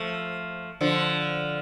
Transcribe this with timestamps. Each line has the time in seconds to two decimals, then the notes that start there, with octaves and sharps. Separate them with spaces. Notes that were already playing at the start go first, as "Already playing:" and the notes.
Already playing: F3 A3
0.81 D3 F3